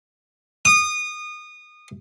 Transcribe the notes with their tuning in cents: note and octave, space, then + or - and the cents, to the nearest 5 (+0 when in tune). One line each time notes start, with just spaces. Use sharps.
D#6 -25